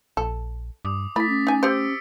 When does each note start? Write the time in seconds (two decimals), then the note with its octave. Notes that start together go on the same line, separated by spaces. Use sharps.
0.17 A#1 A4
0.85 G2 D6 D#6
1.16 A3 E4 B5 A6 B6
1.29 C#4
1.47 D#4 G#5
1.63 G4 C5 E6 C#7 D7